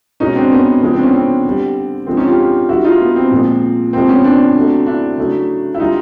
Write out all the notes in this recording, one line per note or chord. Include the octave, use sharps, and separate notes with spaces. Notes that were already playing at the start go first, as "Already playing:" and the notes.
B2 G#3 C#4 D#4
C4 D4
B3 C#4
C#3 F3 G#3 C4
C4 D4
B3 C#4
C4
D3 G3
D3 F3 G#3 C4
C#4 D#4
F4 G4
D3 G3 E4 F#4
D#4 F4
B3
C4
A#2 F3 G#3
C3 F3 G#3 C4
B3 C#4
C4 D4
D3 F#3 A3
D4 E4
C#3 F#3 A3
E4
D3 G3 D#4 F4